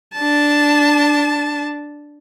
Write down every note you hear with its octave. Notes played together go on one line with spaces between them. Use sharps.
D4 A5